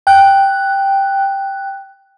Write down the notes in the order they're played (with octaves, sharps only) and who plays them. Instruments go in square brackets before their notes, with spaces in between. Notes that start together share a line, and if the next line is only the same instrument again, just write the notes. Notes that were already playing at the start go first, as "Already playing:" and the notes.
[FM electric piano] G5 F#6